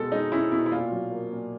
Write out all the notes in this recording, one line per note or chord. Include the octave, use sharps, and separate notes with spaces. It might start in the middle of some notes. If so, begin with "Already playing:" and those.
Already playing: B2 G#3 A4
G#3 D#4
C#4 E4
B2 E4
E4
A#2 F4
F#3
A#3
A#2